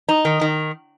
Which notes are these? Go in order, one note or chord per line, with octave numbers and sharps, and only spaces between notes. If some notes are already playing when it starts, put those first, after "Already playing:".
D#4
D#3
D#3